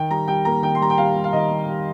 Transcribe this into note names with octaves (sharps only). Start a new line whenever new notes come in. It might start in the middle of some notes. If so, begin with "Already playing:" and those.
Already playing: D#3 G5
G3 A#5
G3 G5
A#3 A#5
D#3 G5
C6
G3 A#5
G5
G3 F5
G3
F5
D#3 D#5
G3
G3